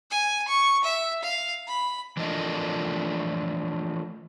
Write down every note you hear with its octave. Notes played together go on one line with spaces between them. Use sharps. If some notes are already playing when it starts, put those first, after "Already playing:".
G#5
C#6
E5
F5
B5
E3 F3 A3 D4 A#4 D#5